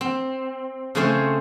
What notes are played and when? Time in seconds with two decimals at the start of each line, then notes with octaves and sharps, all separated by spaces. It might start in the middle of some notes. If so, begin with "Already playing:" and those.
0.01 C4
0.95 C#3 A3 C4 G#4 C5 C#5